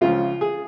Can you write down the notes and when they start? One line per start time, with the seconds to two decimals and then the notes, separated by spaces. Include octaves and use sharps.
0.01 C#2 C#3 F3 F4
0.41 G#4